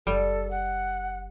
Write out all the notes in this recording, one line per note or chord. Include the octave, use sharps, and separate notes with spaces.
F#1 G3 A4
F#5